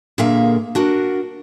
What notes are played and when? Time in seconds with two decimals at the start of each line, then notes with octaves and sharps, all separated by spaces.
0.18 A#2 D3 A#3 G#4 E5 F5
0.75 D4 F#4 A#4 D#5